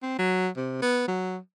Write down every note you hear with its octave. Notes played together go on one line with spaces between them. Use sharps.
C4
F#3
C3
B3
F#3